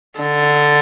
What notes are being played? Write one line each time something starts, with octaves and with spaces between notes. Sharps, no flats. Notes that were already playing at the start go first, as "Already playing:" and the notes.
D3